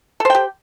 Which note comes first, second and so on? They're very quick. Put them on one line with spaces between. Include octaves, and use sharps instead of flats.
A4 C5 G5 G4